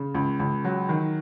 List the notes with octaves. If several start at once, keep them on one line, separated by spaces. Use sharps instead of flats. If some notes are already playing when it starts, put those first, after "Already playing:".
Already playing: C#3
C#2
C#2
F#3
D#3